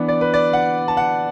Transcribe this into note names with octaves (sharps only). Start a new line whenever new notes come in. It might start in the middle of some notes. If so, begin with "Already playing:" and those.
Already playing: E3 B3 D4
D5
B4
D5
F#5
A5
F#5